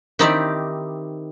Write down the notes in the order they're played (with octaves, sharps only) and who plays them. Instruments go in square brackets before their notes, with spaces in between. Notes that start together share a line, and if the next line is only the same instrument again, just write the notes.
[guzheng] D#3 C4 D#4 E4 G4 D5